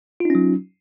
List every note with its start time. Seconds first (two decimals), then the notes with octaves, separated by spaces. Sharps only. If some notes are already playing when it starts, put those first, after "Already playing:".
0.20 F4
0.25 D#4
0.30 C#4
0.35 F#3